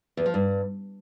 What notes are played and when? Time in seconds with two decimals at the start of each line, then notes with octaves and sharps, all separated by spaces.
0.17 E2
0.26 F3
0.34 G2